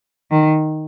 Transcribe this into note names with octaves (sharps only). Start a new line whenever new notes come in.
D#3